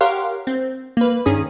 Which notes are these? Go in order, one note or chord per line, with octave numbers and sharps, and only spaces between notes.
G4 A#4 C#5 F5 F#5 C6
C4
A#3 B4
G2 D#3 C#4 G#4 D#6